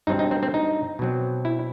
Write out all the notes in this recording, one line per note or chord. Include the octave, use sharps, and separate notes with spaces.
G2 F#3 C4 D#4
D#4
C4
C4
D#4
B2 F#3 C4
E4